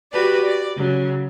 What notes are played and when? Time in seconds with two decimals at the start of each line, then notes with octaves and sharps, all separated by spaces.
0.12 F#4 G4 B4 D5
0.45 D5
0.77 C#3 F#3